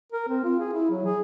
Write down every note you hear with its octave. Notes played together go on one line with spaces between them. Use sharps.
A#4
C4
F4
G#4
E4
F#3
G#4